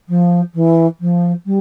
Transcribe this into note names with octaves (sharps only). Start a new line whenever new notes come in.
F3
E3
F3
G3